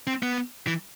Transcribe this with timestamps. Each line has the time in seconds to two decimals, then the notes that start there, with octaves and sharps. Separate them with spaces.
0.07 C4
0.23 B3
0.67 E3